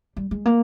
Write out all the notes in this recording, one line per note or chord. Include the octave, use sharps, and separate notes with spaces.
G3
G#3
A#3